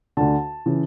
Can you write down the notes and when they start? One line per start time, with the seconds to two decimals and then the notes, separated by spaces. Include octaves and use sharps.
0.17 D2 D3 A5
0.66 C#3 E3